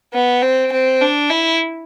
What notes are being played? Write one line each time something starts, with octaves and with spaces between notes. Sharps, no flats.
B3
C4
C4
D4
E4